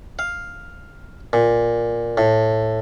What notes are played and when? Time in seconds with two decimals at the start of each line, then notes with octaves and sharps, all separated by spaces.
0.19 F5
1.33 A#2
2.18 A2